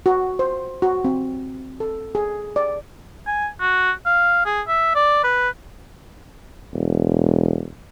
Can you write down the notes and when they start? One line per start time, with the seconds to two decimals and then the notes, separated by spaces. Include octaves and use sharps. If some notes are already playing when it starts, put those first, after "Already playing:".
0.06 F#4
0.39 C5
0.82 F#4
1.04 C4
1.80 A4
2.15 G#4
2.56 D5
3.26 G#5
3.60 F#4
4.05 F5
4.45 G#4
4.68 E5
4.95 D5
5.24 B4
6.74 E1